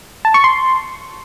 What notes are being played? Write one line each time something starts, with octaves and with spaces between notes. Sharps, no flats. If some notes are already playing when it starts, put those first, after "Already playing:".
A5
C#6
C6